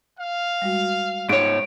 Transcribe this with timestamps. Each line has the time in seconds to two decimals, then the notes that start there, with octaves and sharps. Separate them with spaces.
0.19 F5
0.62 G3 G#3 F#4
1.29 G#2 C#5 D7